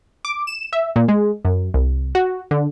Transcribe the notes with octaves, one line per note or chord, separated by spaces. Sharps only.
D6
E7
E5
A#2
G#3
F#2
C2
F#4
D3